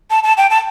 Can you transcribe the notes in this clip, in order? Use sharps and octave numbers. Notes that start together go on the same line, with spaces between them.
A5
A5
G5
A5